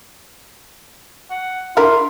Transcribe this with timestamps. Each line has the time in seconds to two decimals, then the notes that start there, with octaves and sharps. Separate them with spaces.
1.31 F#5
1.77 D4 E4 F4 A#4